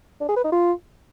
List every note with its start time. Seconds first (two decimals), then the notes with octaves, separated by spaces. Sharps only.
0.21 D4
0.28 G#4
0.36 B4
0.44 D#4
0.52 F4